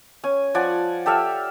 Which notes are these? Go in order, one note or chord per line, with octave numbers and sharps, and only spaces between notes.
C#4 G#5
F3 D5 F#5 G#5
G4 A4 E5 F5